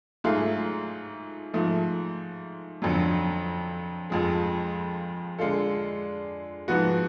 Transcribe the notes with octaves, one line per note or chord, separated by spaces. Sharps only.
G#2 F#3 A3 F4 G#4
G#2 F3 A3
F2 D3 F#3
F2 F3 G#3
D3 G#3 D4 F4 A4
G#2 F3 B3 F#4